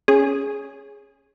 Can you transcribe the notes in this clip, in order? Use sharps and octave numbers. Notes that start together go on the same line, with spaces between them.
C#4 G#4